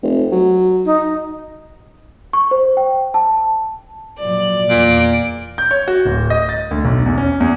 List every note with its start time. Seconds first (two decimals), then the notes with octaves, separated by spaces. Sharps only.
0.03 F1
0.32 F#3
0.85 D#4
2.33 C#6
2.51 C5
2.77 G5
3.14 A5
4.19 A#2 F3 F#3 D5
4.69 E2 A#2 D7
5.58 G6
5.71 C#5
5.88 F#4
6.05 D1
6.30 D#5
6.49 A6
6.71 D2
6.85 B1
7.06 E2
7.18 C#4
7.40 E2